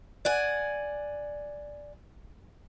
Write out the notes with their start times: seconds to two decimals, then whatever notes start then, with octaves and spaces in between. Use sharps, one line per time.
0.25 D5 F#5 G#5